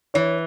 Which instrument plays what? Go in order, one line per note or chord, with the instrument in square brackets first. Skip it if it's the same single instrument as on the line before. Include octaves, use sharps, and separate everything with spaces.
[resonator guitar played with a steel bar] E3 [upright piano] C#5